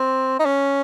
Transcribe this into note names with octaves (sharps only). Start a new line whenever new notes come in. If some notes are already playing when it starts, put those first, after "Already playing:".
Already playing: C4
D#4
C#4